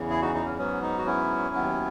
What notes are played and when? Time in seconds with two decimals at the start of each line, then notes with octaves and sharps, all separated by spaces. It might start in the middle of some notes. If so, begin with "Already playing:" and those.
Already playing: E2 C#3 E3
0.10 E4 G#4
0.21 D#4 F#4
0.34 D#4
0.46 C#4
0.58 G#2 F#3 B3 C#4
0.82 D#4
0.98 F#4
1.06 C#4 E4
1.55 D#2 D#3 F#3 B3